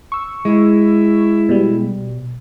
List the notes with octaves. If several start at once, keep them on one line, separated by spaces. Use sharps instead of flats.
C#6 E6
G#3 E4
B2 G3